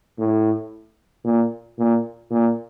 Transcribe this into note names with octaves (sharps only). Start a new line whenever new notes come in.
A2
A#2
A#2
A#2